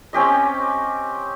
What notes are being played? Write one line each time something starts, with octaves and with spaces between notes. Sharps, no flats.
C4 C#4 G4 D#5